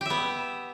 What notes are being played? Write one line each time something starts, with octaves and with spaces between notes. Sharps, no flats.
B3 G4 E5